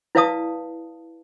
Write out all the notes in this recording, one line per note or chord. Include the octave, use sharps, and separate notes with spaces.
E4 B4 D5 F5 A5 D#6